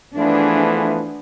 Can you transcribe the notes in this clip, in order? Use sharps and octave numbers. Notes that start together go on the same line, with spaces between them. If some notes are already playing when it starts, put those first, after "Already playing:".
E3 F3 A3 B3 D4 G#4